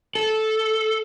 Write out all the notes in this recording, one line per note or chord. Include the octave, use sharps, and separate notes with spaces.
A4